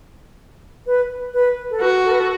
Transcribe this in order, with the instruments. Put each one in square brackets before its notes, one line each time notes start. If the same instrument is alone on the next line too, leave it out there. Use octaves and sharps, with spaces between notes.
[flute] B4
B4
A4
[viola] F#4 [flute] B4
[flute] A4
B4
A4